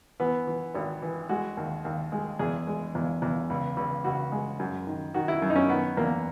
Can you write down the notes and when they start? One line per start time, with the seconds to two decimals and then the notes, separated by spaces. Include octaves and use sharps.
0.20 E3 B3
0.47 E3
0.75 G#1
1.02 E3
1.29 G#3 F#4
1.57 D#2
1.85 D#2
2.12 G#3
2.39 E2 G#4
2.67 G#3
2.95 E2
3.22 E2
3.50 C#2
3.77 C#2
4.04 C#2 F#4
4.32 G#3
4.59 F#2
4.87 D#3
5.14 D#3 F#4
5.28 E4
5.42 F#2
5.50 D#4
5.56 C#4
5.69 D#3 B3
5.97 E2 A#3